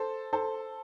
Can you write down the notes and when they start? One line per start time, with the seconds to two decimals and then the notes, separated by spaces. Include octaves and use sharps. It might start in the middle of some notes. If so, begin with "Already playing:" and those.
Already playing: A4 C5
0.33 A4 C5